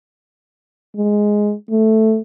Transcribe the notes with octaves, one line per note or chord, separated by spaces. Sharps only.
G#3
A3